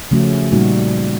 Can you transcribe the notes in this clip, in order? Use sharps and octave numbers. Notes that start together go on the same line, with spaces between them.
C#3 F3 A3 C#4 F#4
A#2 G3 A#3 D#4 F#4